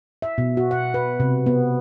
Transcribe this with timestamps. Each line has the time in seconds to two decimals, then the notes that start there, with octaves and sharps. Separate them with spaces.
0.22 E5
0.38 B2
0.57 F#4
0.71 F#5
0.94 B4
1.20 C3
1.46 B3